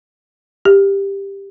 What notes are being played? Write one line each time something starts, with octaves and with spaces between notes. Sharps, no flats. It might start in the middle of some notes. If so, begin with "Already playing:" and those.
G4